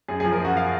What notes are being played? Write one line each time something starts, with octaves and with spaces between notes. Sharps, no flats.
F#2 G#4
F3 G#4
A#4
F#2 F#4
F5